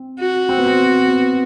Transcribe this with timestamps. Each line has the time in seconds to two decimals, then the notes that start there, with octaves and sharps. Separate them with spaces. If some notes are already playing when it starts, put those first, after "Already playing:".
Already playing: C4
0.20 F#4
0.49 C4
0.58 B3
0.66 C4
1.08 B3